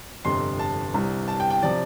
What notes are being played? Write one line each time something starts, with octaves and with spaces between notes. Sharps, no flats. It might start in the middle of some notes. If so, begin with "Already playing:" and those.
G1 F2 C3 C6
A5
C2 C3 G3
A5
G5
G5
C3 F3 D5